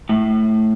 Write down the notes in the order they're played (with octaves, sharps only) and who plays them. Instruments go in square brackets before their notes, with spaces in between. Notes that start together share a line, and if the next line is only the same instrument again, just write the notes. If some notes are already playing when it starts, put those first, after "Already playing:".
[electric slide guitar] A2